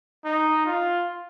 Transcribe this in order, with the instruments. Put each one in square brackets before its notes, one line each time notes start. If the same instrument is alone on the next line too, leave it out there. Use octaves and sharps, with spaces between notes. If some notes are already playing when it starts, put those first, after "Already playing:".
[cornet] D#4
F4